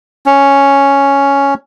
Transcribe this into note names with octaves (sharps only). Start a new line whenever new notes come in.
C#4